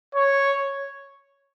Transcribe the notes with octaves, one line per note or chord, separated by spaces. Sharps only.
C#5